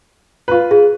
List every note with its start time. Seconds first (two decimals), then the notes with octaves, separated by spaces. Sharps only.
0.48 F4 B4
0.71 G#4